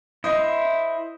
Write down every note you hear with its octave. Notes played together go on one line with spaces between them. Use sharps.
E4 C5 D#5 E5